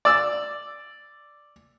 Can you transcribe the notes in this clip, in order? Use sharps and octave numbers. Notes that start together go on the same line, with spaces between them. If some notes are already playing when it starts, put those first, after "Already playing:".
D5 E6